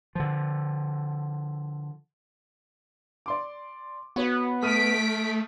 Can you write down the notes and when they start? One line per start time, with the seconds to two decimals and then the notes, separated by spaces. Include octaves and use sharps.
0.15 D3 F3
3.26 D5 C6 D6
4.16 B3 F#4 B4 C#5
4.63 A3 D#6 F6 B6 D7 D#7